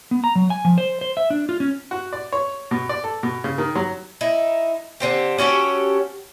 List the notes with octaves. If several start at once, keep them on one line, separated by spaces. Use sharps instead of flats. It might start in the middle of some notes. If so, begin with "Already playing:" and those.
B3
A#5
F#3
G#5
F3
C5
C5
E5
D4
F4
C#4
F#4
D5
C#5
B2
D5
A4
B2
C#3
D#3
F#3
D#4 E4
D3 C4 G4
C#4 F#4 G4 A4